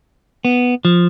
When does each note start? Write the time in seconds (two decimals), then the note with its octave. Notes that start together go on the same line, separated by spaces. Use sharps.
0.45 B3
0.85 F3